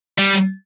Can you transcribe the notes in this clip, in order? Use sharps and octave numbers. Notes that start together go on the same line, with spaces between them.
G3